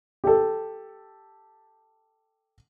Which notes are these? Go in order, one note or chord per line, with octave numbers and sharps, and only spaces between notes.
G4 A4